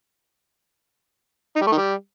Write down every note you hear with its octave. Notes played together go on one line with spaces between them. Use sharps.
D#4
G3
A3
D#3
G3